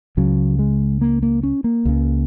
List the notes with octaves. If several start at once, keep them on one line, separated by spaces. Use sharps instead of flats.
C#2 C#3 F#3
G#3
A#3
A#3
C#4
A#3
C#2 C#3